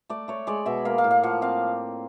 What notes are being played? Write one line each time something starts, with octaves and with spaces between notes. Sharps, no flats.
A3 D5
A3 C#5
G#3 D5
B2 E5
A#3 F5
F5
A2
F5
F3 F#5
C4 F5